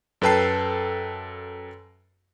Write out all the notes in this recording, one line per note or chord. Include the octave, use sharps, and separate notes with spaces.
F#2 A4 B4 G5 A5 C7